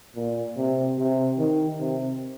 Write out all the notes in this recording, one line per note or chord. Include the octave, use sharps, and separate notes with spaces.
A#2
C3
C3
D#3
C3